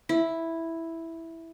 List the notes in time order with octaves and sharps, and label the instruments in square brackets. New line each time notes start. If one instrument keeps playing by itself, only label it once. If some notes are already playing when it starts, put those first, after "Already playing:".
[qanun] E4